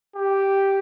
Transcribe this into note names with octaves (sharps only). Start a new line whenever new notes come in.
G4